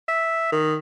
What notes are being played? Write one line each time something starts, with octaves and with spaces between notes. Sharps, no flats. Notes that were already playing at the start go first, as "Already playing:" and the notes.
E5
D#3